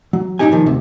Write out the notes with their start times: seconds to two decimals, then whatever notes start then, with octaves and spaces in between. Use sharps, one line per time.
0.13 F#3
0.39 A#2 F#3 C#4 D#4 G4 G#5
0.52 A#2 D#3 F3
0.66 D2 C3